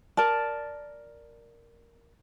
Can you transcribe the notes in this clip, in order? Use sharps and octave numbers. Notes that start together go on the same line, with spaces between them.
A#4 D5 A5